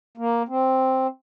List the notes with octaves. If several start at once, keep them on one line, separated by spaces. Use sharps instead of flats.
A#3
C4